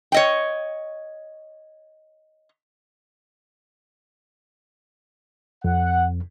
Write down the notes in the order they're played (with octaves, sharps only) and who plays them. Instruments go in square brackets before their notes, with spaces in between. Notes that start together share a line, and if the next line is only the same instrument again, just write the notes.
[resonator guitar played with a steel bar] C#5 D#5 G5
[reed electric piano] F2 [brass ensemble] F#5